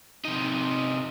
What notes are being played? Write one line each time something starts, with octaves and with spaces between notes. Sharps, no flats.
C3 D#4